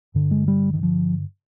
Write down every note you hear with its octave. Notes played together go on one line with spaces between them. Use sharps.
G2 D3
G#3
G3
D#3
F3